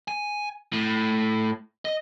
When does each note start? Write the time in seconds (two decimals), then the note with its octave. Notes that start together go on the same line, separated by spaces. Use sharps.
0.08 G#5
0.73 A2
1.85 D#5